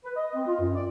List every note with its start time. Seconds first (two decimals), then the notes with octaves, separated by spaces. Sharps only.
0.04 B4
0.16 D#5
0.34 C4
0.46 F4
0.60 F#2
0.75 D5